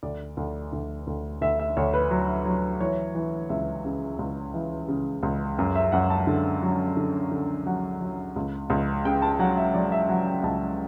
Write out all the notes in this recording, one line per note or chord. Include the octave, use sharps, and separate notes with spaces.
D2 D5
D2
D2
D2
D2 E5
E5
D2 C#5
B4
F#3
F#3
E3 C#5
E3
C#2 E5
C#3
C#2
E3
C#3
C#2
F#2
E5
F#2 F#5
A5
D3
F#3
D3
D3
F#3 F#5
F#3
C#2
C#2
C#3 G5
A5
F#3 F#5
E5
F#3 D5
E5
F#3 F#5
G5
C#2 A5